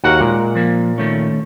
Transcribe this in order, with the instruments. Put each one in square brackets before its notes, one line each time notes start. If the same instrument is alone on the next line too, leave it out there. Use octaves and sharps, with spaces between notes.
[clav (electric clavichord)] D#2 F#4 A#4 [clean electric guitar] F#5
[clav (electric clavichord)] A#2 [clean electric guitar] G#3
[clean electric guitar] F3 A#3
D#3 A3 C#4